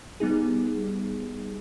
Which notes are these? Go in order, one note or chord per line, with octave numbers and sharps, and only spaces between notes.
G3 B3 D#4 G#4